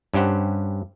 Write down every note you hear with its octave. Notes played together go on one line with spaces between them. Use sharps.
G2 C#4 G4 C5 F#5